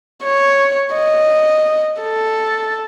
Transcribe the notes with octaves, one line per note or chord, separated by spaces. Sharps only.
C#5
D#5
A4